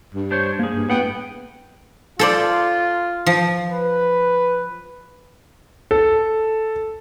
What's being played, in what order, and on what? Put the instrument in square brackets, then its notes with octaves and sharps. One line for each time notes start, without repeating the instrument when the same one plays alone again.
[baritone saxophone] G2
[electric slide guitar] D4 C5 C#5
A#3 G#4
[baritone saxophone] G2
[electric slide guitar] A2 F#5 G5 [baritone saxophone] B3
[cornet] F4 [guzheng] A4 C5 D5
[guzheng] F3
[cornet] B4
[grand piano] A4